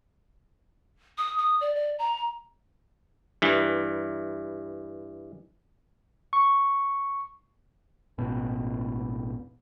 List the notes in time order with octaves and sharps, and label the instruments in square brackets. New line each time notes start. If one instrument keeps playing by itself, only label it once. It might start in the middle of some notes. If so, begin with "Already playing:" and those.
[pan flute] D#6
D#6
D5
D5
A#5
[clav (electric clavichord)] G2 E3
[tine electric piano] C#6
[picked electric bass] E1 A1 B2